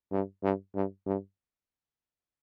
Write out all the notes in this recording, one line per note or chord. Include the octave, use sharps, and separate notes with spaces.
G2
G2
G2
G2